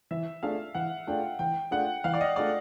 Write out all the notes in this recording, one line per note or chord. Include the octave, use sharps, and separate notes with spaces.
E3 E5
A3 D4 F4 G#4 F5
E3 F#5
A3 D4 F4 G#4 G5
E3 G5
A3 D4 F4 G#4 F#5
E3 F5
D5
D#5
A3 D4 F4 G#4 D5